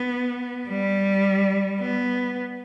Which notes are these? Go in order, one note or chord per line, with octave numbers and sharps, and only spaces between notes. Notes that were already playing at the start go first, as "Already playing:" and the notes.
Already playing: B3
G3
B3